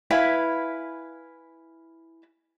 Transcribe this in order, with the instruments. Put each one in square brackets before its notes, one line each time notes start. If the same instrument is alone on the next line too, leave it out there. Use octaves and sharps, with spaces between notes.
[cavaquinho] E4 B4 F5 G#5